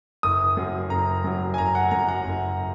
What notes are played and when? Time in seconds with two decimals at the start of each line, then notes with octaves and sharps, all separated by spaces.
0.23 F#1 D#6
0.57 F#2 F#3
0.90 F#1 A#5
1.24 F#2 F#3
1.54 G#5
1.58 F#1 A#5
1.75 F#5
1.91 F#2 F#3 A#5
2.09 F#5
2.25 F#1